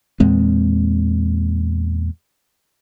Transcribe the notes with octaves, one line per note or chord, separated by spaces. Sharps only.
E2 A#2 G#3 C4